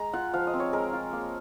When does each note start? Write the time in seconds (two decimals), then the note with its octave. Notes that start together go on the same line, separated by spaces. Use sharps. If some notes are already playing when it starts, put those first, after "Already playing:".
Already playing: G#3 A#5
0.13 F4 F#5
0.34 F3 F5
0.47 D#5
0.53 C4
0.60 C#5
0.73 G#3 A#4
0.93 F4
1.13 A#3